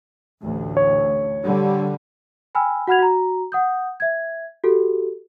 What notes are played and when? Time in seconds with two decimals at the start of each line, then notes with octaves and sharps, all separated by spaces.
0.41 A1 D2
0.77 C#5
1.45 D3 G3
2.55 G5 G#5 B5 E6 F6
2.87 F#4 F#5 B5 F6 G#6 F7
2.99 F#4 A#5
3.52 F#5 D#6 G6
4.00 E5 G#6
4.64 F#4 G4 A4